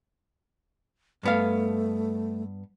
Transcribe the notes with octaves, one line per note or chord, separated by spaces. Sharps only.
G2 A3 B3 F5